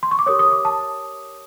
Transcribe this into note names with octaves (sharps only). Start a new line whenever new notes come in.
C6
C#6
D6
G4 A#4 C#5 D#6
D#6
D6
A5